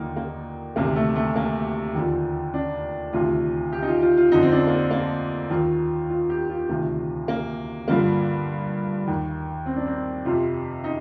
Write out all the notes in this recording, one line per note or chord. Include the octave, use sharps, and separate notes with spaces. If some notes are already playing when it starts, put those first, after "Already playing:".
Already playing: D#2 D3 F3 A#3 D#4
A#3
D2 C3 D#3 A#3
A3
A3
A#3
D#2 D3 F3
D4
D2 C3 D#3 F4
G4
D#4
F4
F4
F4
F2 D3 F3 D#4
C4
D4
A#3
C4
A#3
D#2 D#3 F4
F4
G4
F4
D2 C3 D#3 F4
A#3
G2 D3 F3 A#3
D#2 D#3
C4
D4
C4
F2 C3 F3 F4
D#4